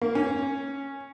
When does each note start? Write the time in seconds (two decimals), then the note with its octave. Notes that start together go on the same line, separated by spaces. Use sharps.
0.01 A#3
0.15 C#4